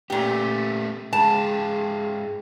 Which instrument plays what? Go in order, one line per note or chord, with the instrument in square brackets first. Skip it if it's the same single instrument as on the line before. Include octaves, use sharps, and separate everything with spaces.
[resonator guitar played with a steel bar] A#2 G4 [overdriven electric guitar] A3 B3
[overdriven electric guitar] G#2 F4 [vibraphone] G#4 G5 [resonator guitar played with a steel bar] A5